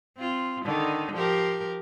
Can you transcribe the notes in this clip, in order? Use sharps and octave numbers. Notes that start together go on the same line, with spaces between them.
C4 F4
D3 D#3 D#4
F3 G4 A#4